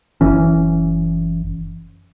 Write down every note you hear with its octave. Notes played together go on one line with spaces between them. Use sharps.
F#1 E3 C#4